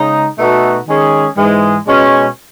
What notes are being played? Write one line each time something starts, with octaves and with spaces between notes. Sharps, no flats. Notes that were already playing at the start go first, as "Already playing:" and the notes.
Already playing: C#3 G#3 D#4
B2 A3 D#4 F#4 A4
D#3 G#3 C#4 G#4
G#2 E3 G#3
B2 G#3 C#4